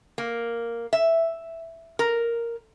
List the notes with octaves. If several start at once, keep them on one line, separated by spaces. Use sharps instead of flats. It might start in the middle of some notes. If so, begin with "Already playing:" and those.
A#3
E5
A#4